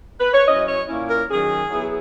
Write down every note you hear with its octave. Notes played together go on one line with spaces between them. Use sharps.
B4
C#5
F#3 C#4 E4 D#5
C#5
A#2 A#3 C#4 E4
A#4
D#3 F#3 C#4 G#4
F#3 B3 E4